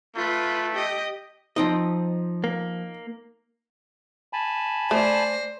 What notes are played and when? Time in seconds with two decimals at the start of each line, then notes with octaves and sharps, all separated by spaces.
0.16 A3 F4 B4
0.74 G4 D#5
1.56 F3 C4 D#4 D#5
2.44 A#3
4.33 G#5 A5 B5
4.91 A3 C5 D5 A#6